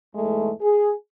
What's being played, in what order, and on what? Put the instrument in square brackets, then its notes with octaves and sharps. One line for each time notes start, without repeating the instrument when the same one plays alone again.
[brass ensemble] E2 G#2 G#3 A3
G#4